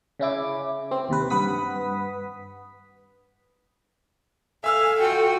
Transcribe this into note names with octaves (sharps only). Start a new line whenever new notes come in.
C#3 C#4 E4 D6
C4
D#2 C3 B4
G2 B4 F#5 D#6 B6
A4 E5 F5 G#5 E6 F6
F4 F#4 G5